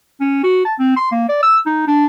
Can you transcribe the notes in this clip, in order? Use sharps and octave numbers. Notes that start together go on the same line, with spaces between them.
C#4
F#4
A5
C4
C6
A#3
D5
E6
D#4
D4